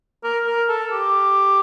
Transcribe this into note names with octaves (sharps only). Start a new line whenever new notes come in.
A#4
A#4
A4
G4